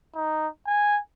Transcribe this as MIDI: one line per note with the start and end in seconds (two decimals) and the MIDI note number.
0.15 0.48 63
0.67 0.99 80